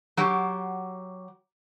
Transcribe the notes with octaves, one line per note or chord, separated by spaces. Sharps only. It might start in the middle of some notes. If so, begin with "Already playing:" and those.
F#3 F#4 G4